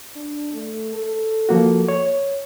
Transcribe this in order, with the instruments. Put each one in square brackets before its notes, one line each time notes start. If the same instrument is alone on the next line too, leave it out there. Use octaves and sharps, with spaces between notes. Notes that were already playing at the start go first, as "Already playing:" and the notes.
[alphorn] D4
A3
A4
[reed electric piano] F3 A#3 F#4
C#5